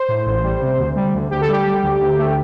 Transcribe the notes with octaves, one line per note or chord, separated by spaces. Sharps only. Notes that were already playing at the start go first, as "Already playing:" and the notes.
Already playing: C5
A2
A1
G3
C3
D2
G3
D2
D2 G4
A4
G3 G4
G3
D2
D2
A3